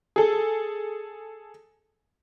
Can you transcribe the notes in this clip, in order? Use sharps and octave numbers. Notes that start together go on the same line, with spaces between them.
G#4 A4